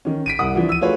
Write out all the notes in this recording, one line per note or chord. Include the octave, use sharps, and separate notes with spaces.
D#3 C#4
B6 D7 D#7
C2 F#5 D#6
E3 F3 D4
E6 D#7
A3 F4 F#4 G#4 B4 C#5